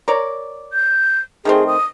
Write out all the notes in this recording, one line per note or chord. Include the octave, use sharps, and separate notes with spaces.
A#4 C#5 D5
G6
D#3 A3 C4 G#4
D#6